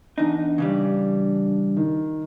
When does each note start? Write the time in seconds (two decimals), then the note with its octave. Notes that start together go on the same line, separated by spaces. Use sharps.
0.18 E2 D4 D#4
0.58 C#3 E3 G3
1.77 D#3